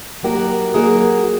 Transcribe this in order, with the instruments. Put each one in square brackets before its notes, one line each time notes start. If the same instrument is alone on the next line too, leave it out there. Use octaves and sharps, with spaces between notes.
[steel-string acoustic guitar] F#3 A#3 D#4 F#4 A#4 [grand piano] G4
[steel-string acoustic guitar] F#3 A#3 D#4 F#4 A#4 [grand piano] G#4